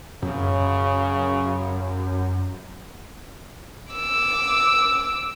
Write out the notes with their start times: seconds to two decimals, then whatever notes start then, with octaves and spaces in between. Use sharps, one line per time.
0.22 F#2 C#3
3.93 D6 E6